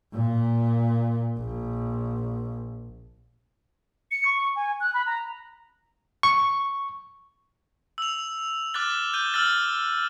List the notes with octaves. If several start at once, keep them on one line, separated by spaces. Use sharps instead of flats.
A#2
A#1
C#7
C#6
G#5
F#6
B5
A#5
C#6
E6 F7
D6 F6 F#6 A6 G7
G6 D#7 G7
E6 F6 G6 A6